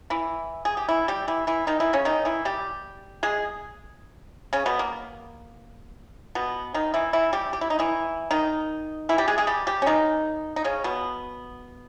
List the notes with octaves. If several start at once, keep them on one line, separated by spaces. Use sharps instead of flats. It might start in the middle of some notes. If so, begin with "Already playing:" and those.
E3 E4
G#4
G4
E3 E4
G3 G4
E3 E4
E3 E4
D#3 D#4
E3 E4
C#3 C#4
D#3 D#4
E3 E4
G3 G4
G#3 G#4
C#3 C#4
B2 B3
A#3
B2 B3
D#3 D#4
E3 E4
E3 E4
G3 G4
G4
E4
D#4
E3 E4
D#3 D#4
E3 E4
G3 G4
G#3 G#4
G#3 G#4
G3 G4
G3 G4
C#4
D#3 D#4
D#4
C#3 C#4
B2 B3